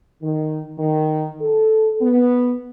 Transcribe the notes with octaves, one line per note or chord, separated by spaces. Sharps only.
D#3
D#3
A4
B3